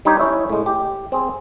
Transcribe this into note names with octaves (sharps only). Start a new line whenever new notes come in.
G3 D4 D#4 G4 C#5
C#4 E4 C#5 E5
A2 C#3 G#3
G4
C4 G#4